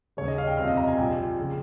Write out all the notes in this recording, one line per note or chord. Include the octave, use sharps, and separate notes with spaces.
D#2 C#3 G3 C#5
D#5
F5
G5
F2 C3 G3 F5
D#5
A#5
G#5
A#1 A#2 G3 G5
C#3 F3